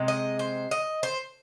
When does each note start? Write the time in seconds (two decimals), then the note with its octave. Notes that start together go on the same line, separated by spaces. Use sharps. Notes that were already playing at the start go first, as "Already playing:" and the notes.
Already playing: C3 G#3
0.08 D#5
0.39 C5
0.71 D#5
1.03 C5